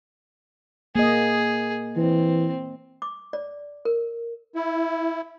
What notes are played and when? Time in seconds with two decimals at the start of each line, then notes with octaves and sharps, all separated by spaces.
0.96 A#3 G#4 D#5
1.97 E3 C4
3.02 D6
3.33 D5
3.85 A#4
4.55 E4